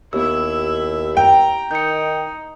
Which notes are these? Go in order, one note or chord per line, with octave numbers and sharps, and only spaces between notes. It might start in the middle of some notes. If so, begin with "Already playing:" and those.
D#2 B3 E4 G4 E5 E6
G5 A#5
D#3 D#4 G6 C#7